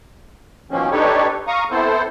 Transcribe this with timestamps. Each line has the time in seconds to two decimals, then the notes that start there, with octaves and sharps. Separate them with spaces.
0.71 B2 D#3 F3 A#3 C4 C#4
0.91 D4 D#4 G4 A4 B4 C#5
1.47 F5 A#5 C#6 D#6
1.71 B3 C4 E4 A4 C5